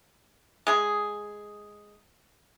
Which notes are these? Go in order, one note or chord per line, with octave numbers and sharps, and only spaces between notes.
G#3 G#4